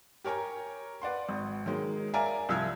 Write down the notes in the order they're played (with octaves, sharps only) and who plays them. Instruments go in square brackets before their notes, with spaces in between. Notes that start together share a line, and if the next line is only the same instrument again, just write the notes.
[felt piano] G4 A#4 C#5 G#5 A#5
B4 D5 F#5 C6
G#1
D#3 F#3 G#3
A#4 D5 E5 F5 G#5 A#5
C2 F3 E6 F6 G#6